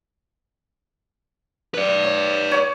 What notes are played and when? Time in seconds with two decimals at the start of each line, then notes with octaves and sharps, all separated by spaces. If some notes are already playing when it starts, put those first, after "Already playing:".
1.74 B4 D5
2.04 C#5
2.51 C#5 D6